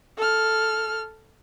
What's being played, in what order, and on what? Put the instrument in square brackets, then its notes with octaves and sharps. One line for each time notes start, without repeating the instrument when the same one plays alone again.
[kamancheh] A4 F6